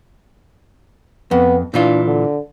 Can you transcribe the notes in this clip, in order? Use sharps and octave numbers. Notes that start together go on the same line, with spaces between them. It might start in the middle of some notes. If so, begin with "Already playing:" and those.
F2 B3
A#2 E3 D4 F4
D3